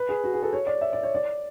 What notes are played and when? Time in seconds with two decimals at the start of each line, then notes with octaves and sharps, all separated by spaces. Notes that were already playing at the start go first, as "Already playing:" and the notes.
Already playing: B4
0.09 G#4
0.24 F#4
0.33 G#4
0.42 A4
0.53 C#5
0.67 D5
0.81 E5
0.93 D5
1.03 C#5
1.15 D5